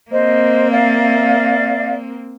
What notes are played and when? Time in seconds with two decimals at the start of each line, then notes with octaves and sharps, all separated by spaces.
0.11 A#3 C4 C5 D#5
0.71 D5 E5 F5